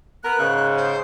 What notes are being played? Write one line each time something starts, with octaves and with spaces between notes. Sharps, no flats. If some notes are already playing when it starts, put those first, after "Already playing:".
B3 A#4 F#6
G#2 C#3
C5